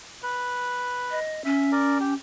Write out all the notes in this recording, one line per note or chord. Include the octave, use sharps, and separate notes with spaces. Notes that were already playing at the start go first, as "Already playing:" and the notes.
B4
D#5
C#4 E5
A#4 D5
G4